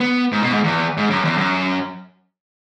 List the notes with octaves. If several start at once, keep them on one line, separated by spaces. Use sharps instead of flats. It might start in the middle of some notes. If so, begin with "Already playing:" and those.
B3
G#2
B2
G#2
E2
G#2
F#2
E2
F#2